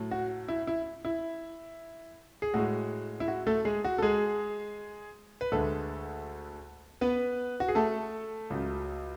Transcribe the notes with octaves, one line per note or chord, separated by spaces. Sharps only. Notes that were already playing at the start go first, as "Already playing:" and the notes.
Already playing: A2 F#3 A3
F#4
E4
E4
E4
G#4
A2 G#3 F#4
E4
F#4
A3 A4
G#3 G#4
F#4
A4
G#3 G#4
B4
D2 D3 G#3 A3 A4
B3 B4
F#4
G#4
A3 A4
C#2 C#3 F#3